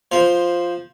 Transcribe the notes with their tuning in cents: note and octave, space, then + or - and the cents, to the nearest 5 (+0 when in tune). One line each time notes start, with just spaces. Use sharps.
F3 +0 C5 +0